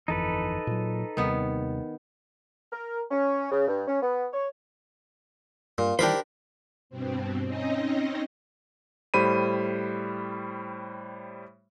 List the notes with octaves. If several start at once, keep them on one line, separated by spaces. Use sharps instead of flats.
G1 F2 E3 D#4 A4 B4
A#2 F#3
D#2 C3 D#3 G3 B3
A#4
C#4
C#3
G2
C#4
B3
C#5
G2 A#2
D#3 E3 G3 D4 G4 A#4 C5 B5
G2 B2 C4
C4 C#4 D#4 D#5
A2 G3 C5 B5 D#7